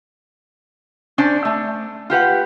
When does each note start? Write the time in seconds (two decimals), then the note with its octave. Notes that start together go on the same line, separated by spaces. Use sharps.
1.18 C#4 D4 C5 D5
1.45 A3
2.10 F4 G4 B4 F#5